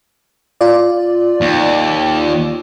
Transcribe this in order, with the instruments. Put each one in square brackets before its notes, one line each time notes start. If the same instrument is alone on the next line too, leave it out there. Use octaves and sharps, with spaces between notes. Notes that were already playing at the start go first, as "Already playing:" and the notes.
[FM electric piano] F4 D5
[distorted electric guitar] D#2